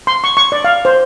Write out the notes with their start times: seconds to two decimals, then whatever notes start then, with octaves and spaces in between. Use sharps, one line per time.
0.07 C6
0.24 C#6
0.37 C#6
0.52 D5
0.64 F5
0.85 C5